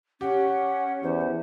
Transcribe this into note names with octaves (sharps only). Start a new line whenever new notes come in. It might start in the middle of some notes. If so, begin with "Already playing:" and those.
C#4 G4 F#5
E2 C5